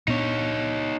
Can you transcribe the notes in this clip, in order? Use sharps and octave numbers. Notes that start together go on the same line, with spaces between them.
A#2 B3 D4 D#4 C#5